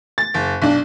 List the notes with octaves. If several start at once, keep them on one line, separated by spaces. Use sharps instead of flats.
A6
F#1
B1 D4